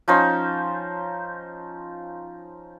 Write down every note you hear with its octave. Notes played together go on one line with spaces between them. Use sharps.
F3 C#4 D#4 C5